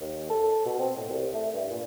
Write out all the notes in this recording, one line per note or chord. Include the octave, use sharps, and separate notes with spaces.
D#2
A4
B2
C4
A2
C2
A3
G2
A#2